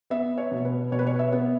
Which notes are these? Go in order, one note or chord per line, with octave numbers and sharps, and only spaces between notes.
B3 E5
C#5
B2
B4
B2 C#5
B4
C#5
E5
B3